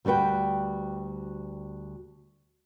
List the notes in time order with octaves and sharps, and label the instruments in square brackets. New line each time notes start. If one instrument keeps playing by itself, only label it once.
[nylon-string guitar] D2 G3 F#4 B4 G5